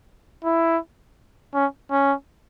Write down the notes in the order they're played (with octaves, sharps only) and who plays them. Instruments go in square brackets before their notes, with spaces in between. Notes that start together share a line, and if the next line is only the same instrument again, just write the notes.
[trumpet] E4
C#4
C#4